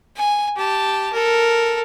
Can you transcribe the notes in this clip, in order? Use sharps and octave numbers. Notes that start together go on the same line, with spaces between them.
G#5
G4 A5
A4 A#4